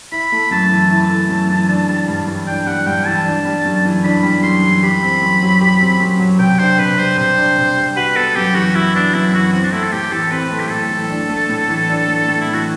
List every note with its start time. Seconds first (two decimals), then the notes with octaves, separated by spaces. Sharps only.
0.12 E4 B5
0.32 A3
0.51 F#2 A5
0.71 E3
0.90 E4 A5
1.09 A3
1.29 F#2
1.49 E3
1.69 D4
1.89 G3
2.08 G2
2.27 E3
2.47 D4 G5
2.66 G3 F#5
2.86 G2 G5
3.06 E3 A5
3.25 D4
3.45 G3
3.65 F#2
3.85 E3
4.04 D4 B5
4.23 G3
4.43 F#2 C6
4.62 E3
4.83 G4 B5
5.03 C4
5.22 F#2
5.42 F#3
5.61 G4
5.81 C4
6.00 F#2
6.19 F#3
6.39 C3 G5
6.59 D4 C5
6.79 C3 B4
6.98 G3 C5
7.17 C3 C5
7.38 D4
7.58 C3
7.77 G3
7.96 F#4 B4
8.16 B3 A4
8.36 F#2 G4
8.55 E3 F#4
8.75 E4 F#4
8.95 B3 D4
9.14 F#2 E4
9.33 E3 F#4
9.53 C4 F#4
9.63 D4
9.72 A3 E4
9.83 A4
9.92 A2 G4
10.12 E3 A4
10.31 C4 B4
10.51 A3
10.60 G4
10.71 A2 A4
10.91 E3
11.10 D4
11.29 A3
11.49 A2
11.68 E3
11.89 D4
12.08 A3
12.28 A2
12.41 E4
12.48 E3
12.54 F#4